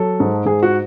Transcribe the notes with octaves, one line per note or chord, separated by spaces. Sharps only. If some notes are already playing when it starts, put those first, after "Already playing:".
Already playing: F#3 A4
G#2
G#2 G#4
F#4